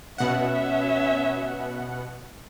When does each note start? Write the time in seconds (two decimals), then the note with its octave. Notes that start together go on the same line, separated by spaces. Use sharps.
0.18 B2 C#4 E5 F#5